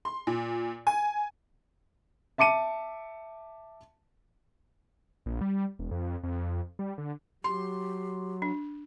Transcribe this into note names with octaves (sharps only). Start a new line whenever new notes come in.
C6
A#2
G#5
E5 A5 D6 C#7 D#7
A#1
G3
E1
F2
F2
G3
D3
F#3 G4 C6
D4